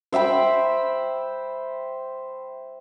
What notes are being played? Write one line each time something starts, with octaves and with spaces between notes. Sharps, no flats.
C5 E5 G5 B5